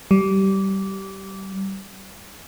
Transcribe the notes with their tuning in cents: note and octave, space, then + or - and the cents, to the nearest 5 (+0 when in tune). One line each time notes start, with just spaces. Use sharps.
G3 -20